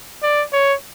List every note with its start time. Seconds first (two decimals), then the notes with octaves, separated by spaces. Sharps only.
0.23 D5
0.53 C#5